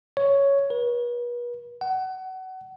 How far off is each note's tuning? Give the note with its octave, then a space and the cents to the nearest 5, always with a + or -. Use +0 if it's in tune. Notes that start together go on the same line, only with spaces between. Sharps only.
C#5 +5
B4 -40
F#5 +25